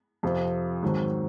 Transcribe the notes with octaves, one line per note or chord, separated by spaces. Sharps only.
F2 C3 F3 C4
G#2 D#3 F#3 C4